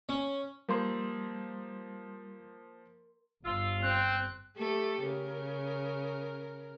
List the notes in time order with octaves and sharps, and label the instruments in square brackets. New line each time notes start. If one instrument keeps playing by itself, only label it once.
[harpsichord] C#4
[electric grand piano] F3 A#3 C5 [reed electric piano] G3 [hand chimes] A#4 C6
[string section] G1 [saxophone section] F4 [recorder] E6
[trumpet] C4 [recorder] F#6
[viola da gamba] A3 G4 A4
C#3 A#4